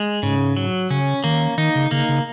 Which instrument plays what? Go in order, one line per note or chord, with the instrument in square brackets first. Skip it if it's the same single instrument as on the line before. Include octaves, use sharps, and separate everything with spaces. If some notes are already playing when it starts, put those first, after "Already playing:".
Already playing: [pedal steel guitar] G#3
[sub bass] G#2 [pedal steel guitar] C#3
[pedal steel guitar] F#3
[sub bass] C#3 [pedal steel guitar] C#4
[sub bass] D#3 [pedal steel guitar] A#3
[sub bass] D#3 [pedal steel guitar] D#4
[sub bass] C#3
[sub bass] C#3 [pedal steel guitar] A#3
[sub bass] C#3